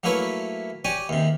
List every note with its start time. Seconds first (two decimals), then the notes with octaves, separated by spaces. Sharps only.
0.03 F#3 A3 A#3 E4 B4 C#5
0.85 G4 C#5 D5 G#5
1.09 D#2 C3